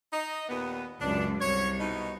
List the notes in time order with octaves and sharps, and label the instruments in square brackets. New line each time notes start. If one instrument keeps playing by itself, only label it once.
[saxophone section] D#4 D#5
D#2 A#2 B3
[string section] C#2 F#2 [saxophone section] D4
[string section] C2 [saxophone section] C#5
[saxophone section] B2 D#4